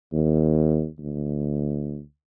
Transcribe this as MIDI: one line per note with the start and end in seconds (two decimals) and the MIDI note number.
0.13 0.87 39
0.99 2.01 38